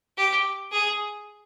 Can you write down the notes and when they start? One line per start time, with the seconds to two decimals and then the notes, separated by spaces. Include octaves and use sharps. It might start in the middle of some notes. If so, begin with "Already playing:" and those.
0.17 G4
0.71 G#4